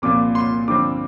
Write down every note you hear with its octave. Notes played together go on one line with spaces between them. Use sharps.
C2 A#2 F3 A#3 D6
C6
G2 D3 F3 C4 D6